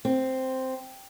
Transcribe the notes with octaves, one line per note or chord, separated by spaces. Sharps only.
C4